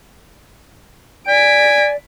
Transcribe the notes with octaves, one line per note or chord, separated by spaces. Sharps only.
D5 G#5 B6 D7